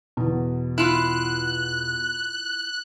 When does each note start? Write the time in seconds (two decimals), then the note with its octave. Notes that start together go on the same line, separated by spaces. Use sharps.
0.17 E2 B2
0.78 E4 F4 F#6